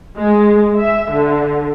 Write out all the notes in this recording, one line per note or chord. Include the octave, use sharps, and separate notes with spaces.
G#3
E5
D3